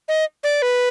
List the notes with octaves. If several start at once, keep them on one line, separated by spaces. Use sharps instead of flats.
D#5
D5
B4